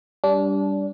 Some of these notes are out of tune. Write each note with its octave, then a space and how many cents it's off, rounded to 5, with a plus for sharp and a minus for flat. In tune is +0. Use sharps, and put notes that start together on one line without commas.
G3 +0 D4 -25